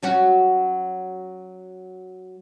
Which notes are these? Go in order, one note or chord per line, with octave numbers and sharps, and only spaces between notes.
F#3 C#4 F#4